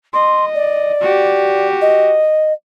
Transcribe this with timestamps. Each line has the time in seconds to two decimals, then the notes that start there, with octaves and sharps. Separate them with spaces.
0.13 D#5 C6
0.54 D5
1.01 F#4 G4
1.81 D#5